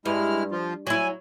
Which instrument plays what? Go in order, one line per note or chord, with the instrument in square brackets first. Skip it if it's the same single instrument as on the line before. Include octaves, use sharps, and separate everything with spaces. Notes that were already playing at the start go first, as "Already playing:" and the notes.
[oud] G2 [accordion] G#3 E4 F6
[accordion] F3 F4
[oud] F#3 E4 [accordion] G#5